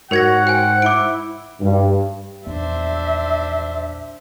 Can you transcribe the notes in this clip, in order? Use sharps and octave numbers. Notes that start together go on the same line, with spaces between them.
G#2 F#4 A#4 C#5 F#5 G#6 A#6
C5 G5 G#5
E4 D6 D7
G2
A#1 E2 B3 D4 C5 E5